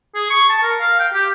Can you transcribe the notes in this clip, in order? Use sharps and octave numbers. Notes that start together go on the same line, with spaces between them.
G#4
C#6
A5
A#4
F5
G5
G4